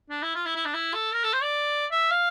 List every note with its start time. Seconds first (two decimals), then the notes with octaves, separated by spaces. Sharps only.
0.10 D4
0.23 E4
0.35 F4
0.46 E4
0.56 E4
0.66 D4
0.74 E4
0.94 A4
1.13 A#4
1.24 A4
1.34 C5
1.43 D5
1.92 E5
2.11 F5